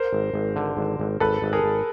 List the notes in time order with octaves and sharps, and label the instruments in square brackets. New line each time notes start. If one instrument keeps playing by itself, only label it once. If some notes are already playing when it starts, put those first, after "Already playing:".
Already playing: [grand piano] A#4 C5
[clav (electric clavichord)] G#1
G#1
D3
G#1
G#1
[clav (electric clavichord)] G#1 [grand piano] A4 B4
[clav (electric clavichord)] G#1
[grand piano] G#4 A#4
[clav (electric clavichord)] G#1